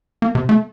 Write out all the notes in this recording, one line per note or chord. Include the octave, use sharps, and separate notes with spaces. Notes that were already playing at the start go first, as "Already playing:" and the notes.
A#3
C3
A3